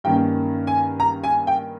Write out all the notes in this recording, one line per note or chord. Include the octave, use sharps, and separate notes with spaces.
G2 D#3 A#3 C#4 G5
G#5
A#5
G#5
G5